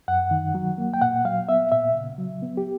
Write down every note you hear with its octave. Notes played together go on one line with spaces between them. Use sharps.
F#2 F#5
D#3
F#3
A#3
G5
A#2 F#5
F#3 F5
B3 E5
A#2 E5
C#3
F#3
B3
G4